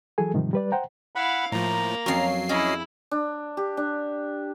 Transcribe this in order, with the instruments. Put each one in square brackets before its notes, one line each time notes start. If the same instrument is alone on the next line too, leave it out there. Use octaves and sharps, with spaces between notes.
[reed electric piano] E3 F#3 G#4 A4 G#5
G#2 C3 D#3 F3 G3
G3 B4 D5
C5 F#5 G5 A#5
[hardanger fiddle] E4 F5 [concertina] F#5 B5
[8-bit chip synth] A2 F3 [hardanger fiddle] A#3 [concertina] A#5
[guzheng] F2 C#4 [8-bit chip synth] F#3 C7
[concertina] C#4 D#5 [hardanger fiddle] E4 [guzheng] G#4
[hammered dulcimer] D4
G4
D4